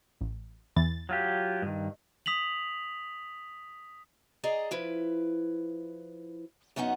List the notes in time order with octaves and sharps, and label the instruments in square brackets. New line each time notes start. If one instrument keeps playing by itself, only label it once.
[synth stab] A1
E2 E3 A6
[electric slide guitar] F#3 F4 G4
G2 D#3
[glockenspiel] D#6 B6 F7 F#7
[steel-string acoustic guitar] G#4 D5 D#5 A#5
F3 E4 B4
F#2 B3 C#4 D#4 F#5